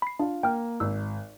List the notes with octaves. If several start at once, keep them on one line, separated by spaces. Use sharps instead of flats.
B5 C7
D4 F4
A#3 G5 F6
G#1 E6